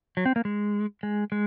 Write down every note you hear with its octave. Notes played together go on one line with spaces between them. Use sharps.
F#3
C4
A#3
G#3
G#3
G#3